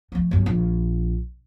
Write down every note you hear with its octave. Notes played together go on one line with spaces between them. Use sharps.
F3 A3
G1 F#2
A#1